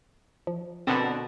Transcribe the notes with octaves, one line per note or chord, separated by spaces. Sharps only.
F3
B2 D3 B3 C4 D4 A#4 C5